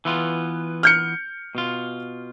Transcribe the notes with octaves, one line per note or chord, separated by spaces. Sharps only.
E3 B3 F4
F6 G6 C#7
B2 F4